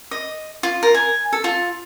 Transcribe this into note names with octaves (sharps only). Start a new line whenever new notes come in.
D#5
F4
A#4
G#5
A4
F4